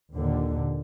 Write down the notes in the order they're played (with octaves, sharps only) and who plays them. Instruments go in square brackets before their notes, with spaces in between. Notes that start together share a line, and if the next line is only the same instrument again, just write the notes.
[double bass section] D#2 A#2 D3